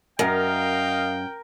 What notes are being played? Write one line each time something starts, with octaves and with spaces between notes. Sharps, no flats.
F#2 A#4 D#5 F5 G5